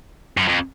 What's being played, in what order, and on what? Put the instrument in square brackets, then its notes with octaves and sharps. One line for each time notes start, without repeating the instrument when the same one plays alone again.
[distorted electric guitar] F#2
F2